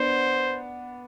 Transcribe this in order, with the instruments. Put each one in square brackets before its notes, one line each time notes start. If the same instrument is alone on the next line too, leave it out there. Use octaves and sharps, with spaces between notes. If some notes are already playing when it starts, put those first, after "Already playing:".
Already playing: [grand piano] B3 D4 [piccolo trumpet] C5